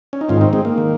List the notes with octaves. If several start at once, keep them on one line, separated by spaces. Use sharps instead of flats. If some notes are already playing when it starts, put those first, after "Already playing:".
C#4
D#4
G#2 D#3 C#4 F4
C4 D#4
G#3 C4
A#3
D#3